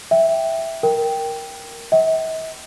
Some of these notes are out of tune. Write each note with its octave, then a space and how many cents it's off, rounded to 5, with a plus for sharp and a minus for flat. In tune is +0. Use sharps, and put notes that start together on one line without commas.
E5 +0 G5 +0
A#4 +0 G5 +0
E5 -45 G5 -35